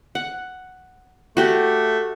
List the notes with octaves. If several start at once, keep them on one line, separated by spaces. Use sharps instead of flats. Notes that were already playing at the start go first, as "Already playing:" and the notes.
F#5
A3 F#4 G4 G5